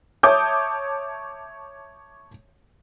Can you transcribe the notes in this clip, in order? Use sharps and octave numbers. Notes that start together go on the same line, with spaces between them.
C#5 E5 A5 D6 D#6 G6